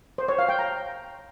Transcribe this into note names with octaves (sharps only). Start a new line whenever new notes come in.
C5
C#5
F5
G5
A#5